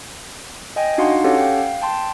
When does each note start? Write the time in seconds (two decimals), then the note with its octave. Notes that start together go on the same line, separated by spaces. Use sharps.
0.76 D#5 G5 G#5
0.98 D4 D#4 F#4 F5 F#5 C6
1.24 C#4 G4 A4 C#5 F5 F#5
1.38 F5 G5
1.82 G5 A5 C6